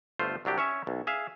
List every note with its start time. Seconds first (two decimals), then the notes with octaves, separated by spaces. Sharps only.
0.19 G1 A3 F4 C5
0.45 C2 F#3 D4 G4
0.58 C#4 C#5 E5
0.87 B1
1.07 G#4 E5 F5